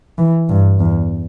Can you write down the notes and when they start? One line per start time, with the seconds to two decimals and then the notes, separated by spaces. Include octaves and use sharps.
0.18 E3
0.49 G2
0.80 E2